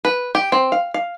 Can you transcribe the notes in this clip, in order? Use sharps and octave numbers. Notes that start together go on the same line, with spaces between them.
B4
G4
C4
F5
F5